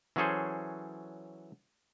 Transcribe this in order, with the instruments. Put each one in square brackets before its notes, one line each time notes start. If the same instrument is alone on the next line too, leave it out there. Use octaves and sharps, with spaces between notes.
[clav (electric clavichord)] E3 F#3 C#4 G#4 A4 C5